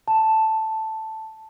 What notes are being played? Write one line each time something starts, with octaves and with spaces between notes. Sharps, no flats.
A5